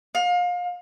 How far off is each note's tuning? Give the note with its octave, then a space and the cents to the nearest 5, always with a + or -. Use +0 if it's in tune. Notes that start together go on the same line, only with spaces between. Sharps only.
F5 +30